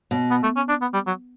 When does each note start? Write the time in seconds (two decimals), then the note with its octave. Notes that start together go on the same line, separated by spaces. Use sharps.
0.11 B2
0.31 B3
0.43 A3
0.56 C#4
0.69 D4
0.81 B3
0.94 G3
1.07 F#3